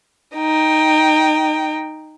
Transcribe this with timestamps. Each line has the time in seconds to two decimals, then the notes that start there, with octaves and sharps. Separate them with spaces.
0.35 D#4 G5